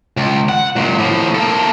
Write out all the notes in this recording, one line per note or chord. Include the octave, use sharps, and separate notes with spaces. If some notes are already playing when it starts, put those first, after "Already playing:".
C#2
F#5
C#2 A#2
A2 F3
A#3 A4